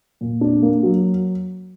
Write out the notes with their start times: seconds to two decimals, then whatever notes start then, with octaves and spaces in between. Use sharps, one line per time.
0.21 A#2
0.41 D4
0.62 A#3
0.83 F#3